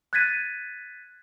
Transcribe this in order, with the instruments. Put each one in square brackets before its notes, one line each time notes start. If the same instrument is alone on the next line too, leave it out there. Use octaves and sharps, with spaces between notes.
[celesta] F#6 G#6 A6 B6 D#7